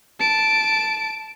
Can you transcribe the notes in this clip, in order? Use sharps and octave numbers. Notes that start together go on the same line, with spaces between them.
A5 D7